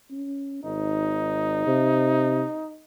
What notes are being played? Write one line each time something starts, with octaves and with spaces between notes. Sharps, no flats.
C#4
G#1 D#4
C3